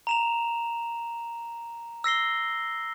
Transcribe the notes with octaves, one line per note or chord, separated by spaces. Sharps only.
A#5 E7 F7
E6 A#6 C7 G7